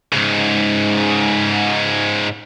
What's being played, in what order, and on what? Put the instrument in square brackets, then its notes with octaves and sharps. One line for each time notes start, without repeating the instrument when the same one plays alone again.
[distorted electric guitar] G#2 C#3